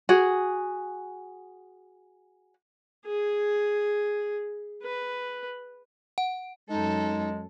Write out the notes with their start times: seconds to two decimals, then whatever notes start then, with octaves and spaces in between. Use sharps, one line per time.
0.09 F#4 G#4
3.06 G#4
4.83 B4
6.18 F#5
6.69 F#2 G#3 D#4 A4